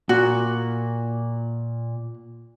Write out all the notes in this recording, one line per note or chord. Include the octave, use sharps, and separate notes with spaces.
A#2 F#4